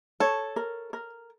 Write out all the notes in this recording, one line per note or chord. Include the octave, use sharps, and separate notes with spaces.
A4 C#5
A#4
A#4